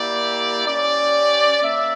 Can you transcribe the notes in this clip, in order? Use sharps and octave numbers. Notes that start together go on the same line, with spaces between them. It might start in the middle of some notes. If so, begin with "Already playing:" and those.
Already playing: A#3 E4 G4 D5
C#4 G4 D5
A#3 E5